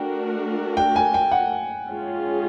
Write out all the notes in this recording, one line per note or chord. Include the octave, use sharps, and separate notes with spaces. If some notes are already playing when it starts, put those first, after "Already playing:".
Already playing: A3 D4 F#4 A#4 G5
G5
G#5
G5
F#5
G#3 C#4 F4 G#4